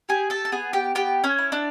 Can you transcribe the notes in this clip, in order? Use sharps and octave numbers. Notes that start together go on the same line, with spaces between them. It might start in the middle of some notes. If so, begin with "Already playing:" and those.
G4 G#4 G#5
A4 A5
A5
B3 G#4 G#5
G4 G5
B3 G4 G5
C#4 C#5
E4
D4 D5